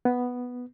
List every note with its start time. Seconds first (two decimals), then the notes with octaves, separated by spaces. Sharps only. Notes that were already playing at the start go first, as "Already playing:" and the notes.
0.05 B3